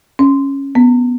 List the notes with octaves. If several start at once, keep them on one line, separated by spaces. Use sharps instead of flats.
C#4
B3